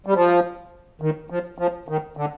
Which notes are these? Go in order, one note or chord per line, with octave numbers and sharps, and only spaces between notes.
G3
F3
D#3
F3
F3
D#3
D3